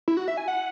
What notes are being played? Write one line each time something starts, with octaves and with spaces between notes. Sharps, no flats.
E4
F#4
E5
G#5
F#5